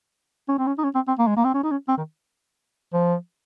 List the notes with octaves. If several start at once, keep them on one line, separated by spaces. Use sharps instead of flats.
C#4
C4
C#4
D#4
C#4
C4
C4
A#3
G#3
A#3
C4
C#4
D#4
C#4
C4
D#3
F3